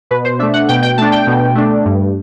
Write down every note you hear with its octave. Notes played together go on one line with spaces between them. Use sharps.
B2 B4
C5
A3 D4 E5
F#5
B2 G5
G5
A3 D4 A5
G5
B2
A3 D4
G2